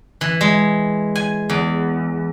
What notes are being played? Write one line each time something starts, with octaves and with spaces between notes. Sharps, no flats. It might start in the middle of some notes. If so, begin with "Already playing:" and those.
E3
G#3
G#5
E2